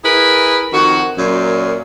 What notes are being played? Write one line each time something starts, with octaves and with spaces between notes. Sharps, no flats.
E4 G#4 A#4 B4
F2 D#3 F#4
F#2 A#2